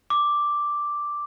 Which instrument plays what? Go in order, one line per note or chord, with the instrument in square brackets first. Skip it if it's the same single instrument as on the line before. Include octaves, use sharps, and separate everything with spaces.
[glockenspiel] D6